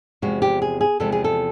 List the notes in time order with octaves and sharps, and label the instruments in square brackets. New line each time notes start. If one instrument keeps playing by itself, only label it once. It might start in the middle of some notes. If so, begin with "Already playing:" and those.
[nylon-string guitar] E2 C3 F3 G#3 F#4
G4
G#4
G#4
E2 C3 F3 G#3 A4
G#4
A4